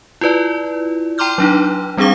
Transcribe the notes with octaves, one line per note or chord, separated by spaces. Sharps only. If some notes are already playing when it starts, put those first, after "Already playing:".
E4 F4 B4 D5
G5 A#5 C6 D6 F6 G6
F#3 D4 D#4
G3 C4 D4 G#4 F5 D6